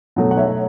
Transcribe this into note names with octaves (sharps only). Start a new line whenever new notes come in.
B2 F#3 A3
F#5
C#5 E5